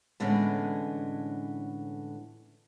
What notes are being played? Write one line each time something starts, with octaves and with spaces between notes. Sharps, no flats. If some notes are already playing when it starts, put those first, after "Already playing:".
A2 D3 E3 G#3 B3 C#4